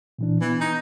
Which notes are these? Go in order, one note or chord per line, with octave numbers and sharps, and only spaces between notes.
A#2 E3 D4
E3 B3
D#4